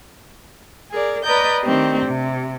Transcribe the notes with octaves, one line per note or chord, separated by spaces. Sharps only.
G#4 A#4 D5
B4 D5 D#5 A#5 G6
D#3 A3 C4 D4 G4
C3